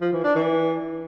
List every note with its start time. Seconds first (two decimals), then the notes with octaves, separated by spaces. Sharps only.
0.01 F3
0.12 E3
0.24 D4
0.35 E3